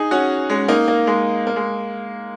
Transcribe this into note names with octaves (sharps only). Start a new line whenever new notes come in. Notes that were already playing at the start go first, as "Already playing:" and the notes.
Already playing: D#4 G#4
C#4 F#4
G#3 C#4
A#3 D#4
A#3
G#3
A#3
G#3